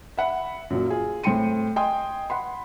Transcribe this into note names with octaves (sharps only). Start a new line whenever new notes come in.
E5 F#5 B5
F#2 A#2 F#3
F4 G#4
A2 C4 G5 C6 C#7 D#7
D#5 G5 G#5 C6 D#6
F#5 B5 C6